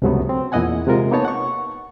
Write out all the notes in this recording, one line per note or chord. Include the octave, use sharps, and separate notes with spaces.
C#2 G2 C3 F#3 A3 B3
C4
E2 A#2 E4 D#5 F#5 G#5
C3 G#3 F4 A#4
A#3 B3 D#4 C#5 A5
F#5 C#6